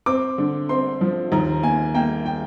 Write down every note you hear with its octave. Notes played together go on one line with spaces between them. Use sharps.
C4 D6
D3
C4 C6
F3
D#2 A#5
A#3 G#5
A#3 G5
G5